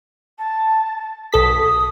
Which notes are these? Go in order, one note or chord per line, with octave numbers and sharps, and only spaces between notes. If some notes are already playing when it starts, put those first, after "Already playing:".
A5
B1 A4 D#6 B6